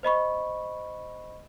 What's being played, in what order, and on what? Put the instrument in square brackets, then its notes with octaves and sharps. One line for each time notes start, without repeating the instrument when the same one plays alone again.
[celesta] C5 D#5 B5 C#6